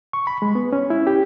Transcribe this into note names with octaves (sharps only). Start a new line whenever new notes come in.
C#6
B5
G#3
B3
C#4
E4
G4